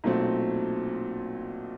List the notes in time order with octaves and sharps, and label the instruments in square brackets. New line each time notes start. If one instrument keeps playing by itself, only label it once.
[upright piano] B1 A#2 F#3 A3 C4